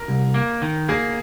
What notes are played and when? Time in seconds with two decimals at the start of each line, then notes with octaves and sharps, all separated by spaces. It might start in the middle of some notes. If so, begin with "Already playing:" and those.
Already playing: A#4
0.08 C2
0.34 A#3
0.62 D#3
0.89 A#3 G#4